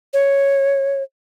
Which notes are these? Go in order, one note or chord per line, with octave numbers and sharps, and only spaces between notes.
C#5